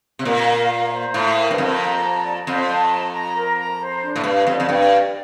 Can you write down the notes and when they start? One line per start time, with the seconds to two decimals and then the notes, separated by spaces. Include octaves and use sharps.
0.19 C3
0.25 A#2 A#4
0.47 F5
0.70 A#5
0.92 C5
1.14 A2 F5
1.37 A#4
1.51 G2
1.58 F2 C5
1.80 A#5
2.03 A5
2.24 D5
2.46 F2 C5
2.69 A5
2.92 A#5
3.13 A#5
3.35 A#4
3.58 A#5
3.80 C5
4.02 D4
4.16 A2
4.24 G2 F5
4.47 F2 D5
4.60 F2
4.68 G2 G5
4.91 D5